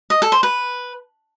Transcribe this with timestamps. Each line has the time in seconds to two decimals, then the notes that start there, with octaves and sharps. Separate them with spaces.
0.10 D#5
0.22 A4
0.32 C5
0.43 B4